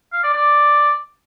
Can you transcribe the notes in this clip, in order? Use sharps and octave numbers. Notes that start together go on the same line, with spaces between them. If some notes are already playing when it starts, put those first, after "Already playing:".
F5
D5
D5